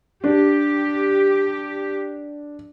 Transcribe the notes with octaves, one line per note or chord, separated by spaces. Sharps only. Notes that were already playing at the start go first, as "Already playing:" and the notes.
D4 G4